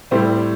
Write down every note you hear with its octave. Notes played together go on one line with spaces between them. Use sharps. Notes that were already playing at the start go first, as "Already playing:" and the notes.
A2 G3 C4 E4